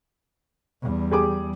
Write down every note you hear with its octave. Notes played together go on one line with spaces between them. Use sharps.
E2 G3
G4 G#4 D6